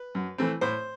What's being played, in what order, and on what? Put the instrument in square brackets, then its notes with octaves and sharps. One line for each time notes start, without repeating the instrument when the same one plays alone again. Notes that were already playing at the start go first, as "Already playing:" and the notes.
Already playing: [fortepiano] B4
F#2
E3 A3 C4
A2 C5